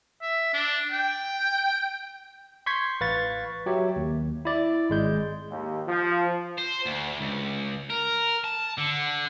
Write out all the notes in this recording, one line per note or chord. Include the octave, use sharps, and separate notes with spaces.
E5
D4
G5
C6 C#6 G6 G#6 B6
A1 B4 F5 C#6 A6
F#3 G4 C#5 E5
D#2
E4 D5
G#1 G#3 G6
D#2
F3
C5
D2
C#2
A#4
A5
D3